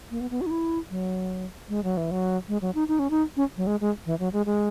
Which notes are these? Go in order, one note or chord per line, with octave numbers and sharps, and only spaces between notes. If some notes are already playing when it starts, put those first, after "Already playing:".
A#3
B3
B3
F#4
D#4
E4
F#3
G#3
F#3
E3
F#3
G#3
F#3
D#4
D#4
C#4
D#4
C#4
F#3
G#3
G#3
E3
F#3
G#3
G#3